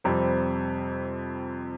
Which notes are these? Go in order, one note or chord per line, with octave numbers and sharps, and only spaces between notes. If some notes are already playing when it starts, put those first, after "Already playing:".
F2 C3 G3 C4